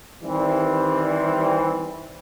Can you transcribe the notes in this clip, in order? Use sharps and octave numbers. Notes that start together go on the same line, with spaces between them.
D#3 E3 G3 C4